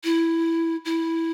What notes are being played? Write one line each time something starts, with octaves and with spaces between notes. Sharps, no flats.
E4
E4